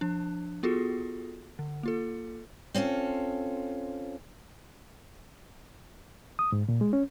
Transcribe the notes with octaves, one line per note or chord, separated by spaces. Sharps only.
F3 D4
B3 F4 F#4 G#4 A4
D3
A#3 F4 A4
C4 C#4 F4 A4
D#6
G#2
A#2
G#3
C#4